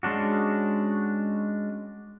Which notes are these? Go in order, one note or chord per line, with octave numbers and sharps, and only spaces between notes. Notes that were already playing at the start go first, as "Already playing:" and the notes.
G#3 C#4 D4 F#4